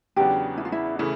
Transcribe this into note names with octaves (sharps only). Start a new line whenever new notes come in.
E2 C#3 F#3 B3 D4 G4
E4
F4
E4
C#3 E3 A3 E4